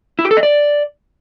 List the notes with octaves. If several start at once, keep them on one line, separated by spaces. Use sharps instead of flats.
E4
G4
A4
D#5
D5